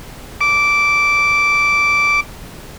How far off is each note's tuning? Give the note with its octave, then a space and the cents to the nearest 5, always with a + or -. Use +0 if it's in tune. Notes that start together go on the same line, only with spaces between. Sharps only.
D6 -10